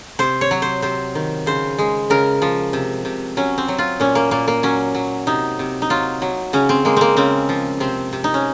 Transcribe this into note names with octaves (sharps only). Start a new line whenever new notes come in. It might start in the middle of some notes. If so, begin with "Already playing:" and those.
C3 C5
C#5
F#3
C5
C3 C5
D#3
C#3 C5
G#3
C#3 A#4
F3
C3
C3
F#3 C#4
C4
F#3
F4
A#2 C#4
A#3
A#2 A#3
A#3
F#3 C#4
F#3
C3 D#4
C3
D#4
F#3 F4
F#3
C#3 C#4
C4
G#3 A#3
A#3 C4
C#3 C4
F3
C3 C4
C3
D#4
C#4